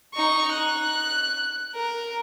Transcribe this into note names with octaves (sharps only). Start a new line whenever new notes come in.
D#4 C#6
F#6
A#4